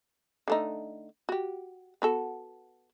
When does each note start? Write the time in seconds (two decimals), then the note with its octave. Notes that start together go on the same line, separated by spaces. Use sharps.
0.48 D3 A3 D#4
1.29 F#4 G4
2.02 B3 F#4 A4